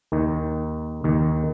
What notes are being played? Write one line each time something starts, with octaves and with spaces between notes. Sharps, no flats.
D#2 D#3
D#2 D#3